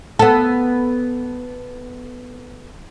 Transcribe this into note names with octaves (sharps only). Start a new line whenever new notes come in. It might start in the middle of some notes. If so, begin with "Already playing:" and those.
B3 A4